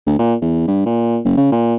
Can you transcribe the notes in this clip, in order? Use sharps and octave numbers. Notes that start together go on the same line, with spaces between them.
D2
A#2
E2
G2
A#2
F#1
C#3
A#2